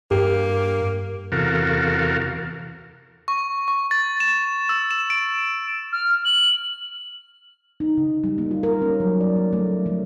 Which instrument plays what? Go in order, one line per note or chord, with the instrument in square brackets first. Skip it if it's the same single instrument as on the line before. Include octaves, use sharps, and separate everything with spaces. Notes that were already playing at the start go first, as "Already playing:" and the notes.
[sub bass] G2 [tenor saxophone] A#3 [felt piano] G4
[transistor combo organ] E2 C3 F#4 A4 A#4 F5
[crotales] C#6
C#6
A6
E7
E6
E7
D7
[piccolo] F6
F#7
[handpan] D#4
C#3
G3
A#3
F4
A#4
C#4
F#3
D5
A#3
A3
F3